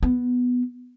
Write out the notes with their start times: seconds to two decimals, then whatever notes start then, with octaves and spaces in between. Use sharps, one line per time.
0.03 B3